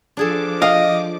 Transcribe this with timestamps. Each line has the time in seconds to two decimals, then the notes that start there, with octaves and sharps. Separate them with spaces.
0.17 F3 D4 G#4 A4 D6
0.62 D#5 F5